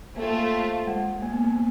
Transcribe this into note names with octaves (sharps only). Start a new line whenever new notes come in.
A3 A#3 C4 F4
G#3
A#3
B3
A#3